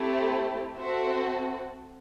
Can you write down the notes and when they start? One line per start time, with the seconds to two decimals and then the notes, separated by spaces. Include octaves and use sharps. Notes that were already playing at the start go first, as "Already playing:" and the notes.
Already playing: A3 C4 E4 G4
0.76 C4 F#4 A4 C5 E5